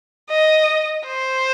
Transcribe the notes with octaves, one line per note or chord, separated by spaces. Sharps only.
D#5
C5